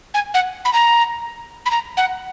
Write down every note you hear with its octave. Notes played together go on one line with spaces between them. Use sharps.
G#5
F#5
B5
A#5
B5
A#5
F#5